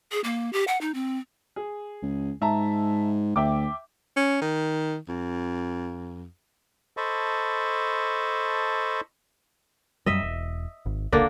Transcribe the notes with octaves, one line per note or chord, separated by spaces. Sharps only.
G#4
A#3
G4
F#5
D#4
C4
G#4
C#2
G#2 E5 A5 A#5
D2 E5 G5 D6
C#4
D#3
F2
A4 C5 D#5 A5 B5 C#6
F#2 G3 D#5 E5
E1
G#1
D1 C#2 D3 A#3 D4